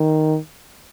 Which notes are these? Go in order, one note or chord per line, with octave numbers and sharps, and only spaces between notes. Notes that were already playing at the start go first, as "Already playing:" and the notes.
Already playing: D#3